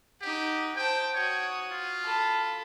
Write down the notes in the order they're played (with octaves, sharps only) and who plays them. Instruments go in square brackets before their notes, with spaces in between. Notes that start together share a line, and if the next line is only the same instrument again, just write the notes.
[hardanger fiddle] D#4 F#5 [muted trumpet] G4
[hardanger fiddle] C5 A5 [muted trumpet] G5
[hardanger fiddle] F#4 D#6 [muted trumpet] C#5
[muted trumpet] F4
[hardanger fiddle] A4 B5